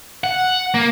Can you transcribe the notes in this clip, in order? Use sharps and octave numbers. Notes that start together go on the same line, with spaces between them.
F#5
A#3